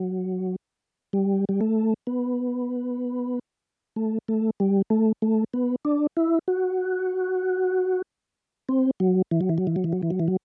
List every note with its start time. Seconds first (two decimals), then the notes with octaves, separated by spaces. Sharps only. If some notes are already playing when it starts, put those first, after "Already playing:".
Already playing: F#3
1.13 G3
1.49 G3
1.61 A3
2.07 B3
3.96 A3
4.28 A3
4.60 G3
4.90 A3
5.22 A3
5.54 B3
5.85 D4
6.17 E4
6.48 F#4
8.69 C4
9.00 F#3
9.31 E3
9.41 F#3
9.49 E3
9.58 F#3
9.67 E3
9.76 F#3
9.84 E3
9.93 F#3
10.02 E3
10.10 F#3
10.20 E3
10.28 F#3